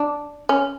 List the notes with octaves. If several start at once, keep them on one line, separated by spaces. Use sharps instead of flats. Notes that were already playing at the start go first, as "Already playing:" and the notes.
Already playing: D4
C#4